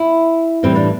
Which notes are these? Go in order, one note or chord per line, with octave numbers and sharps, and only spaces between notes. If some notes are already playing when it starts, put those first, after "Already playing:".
Already playing: E4
A2 E3 G3 C4
D4